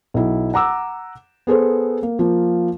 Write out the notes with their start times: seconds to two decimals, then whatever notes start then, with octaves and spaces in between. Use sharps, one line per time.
0.14 B1 E4
0.54 F#5 A#5 D6 E6
1.47 B3 G#4 A4 C5
2.03 A#3
2.19 F3 A#3